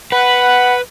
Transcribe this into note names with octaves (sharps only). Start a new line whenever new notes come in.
B4 F#5 B5